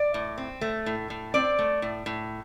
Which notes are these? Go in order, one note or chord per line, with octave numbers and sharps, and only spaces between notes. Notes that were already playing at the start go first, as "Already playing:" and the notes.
Already playing: D5
A2
C4
A3
A2
A2
C4 D5
A3
A2
A2